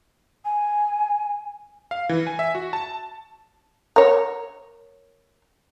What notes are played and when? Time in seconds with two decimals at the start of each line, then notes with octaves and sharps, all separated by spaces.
0.45 G#5
1.91 F5
2.09 E3
2.27 G#5
2.39 E5
2.55 F#4
2.73 A5
3.96 A#4 C#5